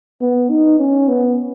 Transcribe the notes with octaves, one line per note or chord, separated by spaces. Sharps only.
B3
D#4
C#4
B3